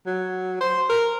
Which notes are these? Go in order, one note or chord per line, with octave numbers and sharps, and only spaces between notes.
F#3
C5
A#4